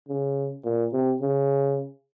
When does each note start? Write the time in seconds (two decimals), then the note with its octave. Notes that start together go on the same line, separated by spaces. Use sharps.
0.09 C#3
0.65 A#2
0.93 C3
1.21 C#3